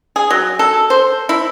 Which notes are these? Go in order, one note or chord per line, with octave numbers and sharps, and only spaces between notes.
G#4
F#3
A4
C5
E4